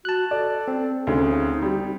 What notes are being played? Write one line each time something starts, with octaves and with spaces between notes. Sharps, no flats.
F#4 A5 F#6
A4 D5
C4
D2 C#3 D#4
G3